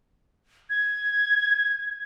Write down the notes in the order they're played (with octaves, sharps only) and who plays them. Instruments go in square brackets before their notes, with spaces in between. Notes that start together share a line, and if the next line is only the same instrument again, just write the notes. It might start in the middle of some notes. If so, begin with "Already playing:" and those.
[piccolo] G#6